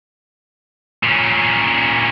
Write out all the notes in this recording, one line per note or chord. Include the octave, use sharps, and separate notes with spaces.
A#2 C#4